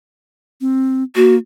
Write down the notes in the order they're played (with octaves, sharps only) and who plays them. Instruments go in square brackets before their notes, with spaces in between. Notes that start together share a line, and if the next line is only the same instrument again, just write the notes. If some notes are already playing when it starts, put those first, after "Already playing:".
[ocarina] C4
[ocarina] A#3 [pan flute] F#4